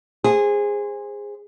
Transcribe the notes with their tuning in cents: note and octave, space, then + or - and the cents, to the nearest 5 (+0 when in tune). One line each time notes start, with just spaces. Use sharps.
G#4 -20 C5 +10